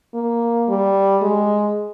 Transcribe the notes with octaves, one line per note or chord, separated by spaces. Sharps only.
A#3
G3
G#3